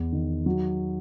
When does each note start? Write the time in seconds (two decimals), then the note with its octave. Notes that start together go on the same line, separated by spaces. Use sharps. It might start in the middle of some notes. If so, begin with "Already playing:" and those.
Already playing: E2
0.12 D#3
0.46 F#3